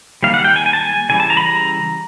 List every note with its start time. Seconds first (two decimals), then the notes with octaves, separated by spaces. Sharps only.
0.23 D#3 G3 A#3 F5
0.34 F#5
0.44 G5
0.56 G#5
0.66 G#5
0.73 A5
0.81 G#5
1.09 C#3 E3 G3 G#5
1.20 A5
1.30 A#5
1.37 B5
1.41 A#5